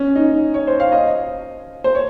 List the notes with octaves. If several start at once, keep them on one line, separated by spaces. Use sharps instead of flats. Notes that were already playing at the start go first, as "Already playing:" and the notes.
Already playing: C#4
D#4
C#5
C5
F5
D#5
C5
C#5